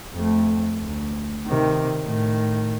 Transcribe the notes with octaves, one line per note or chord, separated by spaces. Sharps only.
F2 A3
D2
C3 D#3
A2 D#3